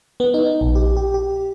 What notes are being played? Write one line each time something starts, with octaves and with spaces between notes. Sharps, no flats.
B3
D#4
A#1
G4
G4
G4